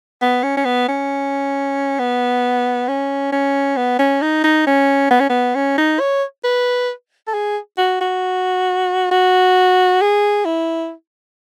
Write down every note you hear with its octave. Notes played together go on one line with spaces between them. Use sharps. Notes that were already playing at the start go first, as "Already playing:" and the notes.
B3
C#4
C#4
B3
C#4
B3
C#4
C#4
B3
C#4
D#4
D#4
C#4
B3
C#4
B3
C#4
D#4
C#5
B4
A4
G#4
F#4
F#4
F#4
G#4
E4